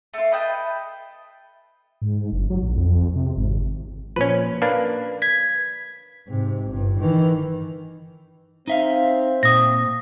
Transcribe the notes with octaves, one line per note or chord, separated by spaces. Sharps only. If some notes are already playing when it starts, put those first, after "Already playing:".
A3 F4
B4 D#5 G5 A5
G#2
F#1
F#3
A#1
F2
C3
G#1
A#2 F3 C#4 B4
A#3 D4 B4
G#6 B6
G#2 C3
G1 G2
D#3 E3
C4 D#4 E5 F5
A#2 D#6 A#6